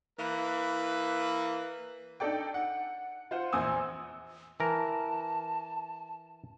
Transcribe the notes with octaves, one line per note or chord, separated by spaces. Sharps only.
E3 A#3 B4
D4 D#4 A4 D5 G5
F#5
F4 C5 F#5
A#1 E2 C5 G#5 D#6 E6
E3 A#4 A5